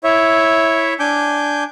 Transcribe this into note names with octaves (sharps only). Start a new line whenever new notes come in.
E4 C#5 E5
D4 G#5 D6 G6